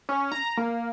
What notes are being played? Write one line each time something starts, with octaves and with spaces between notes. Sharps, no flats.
C#4
A#5
A#3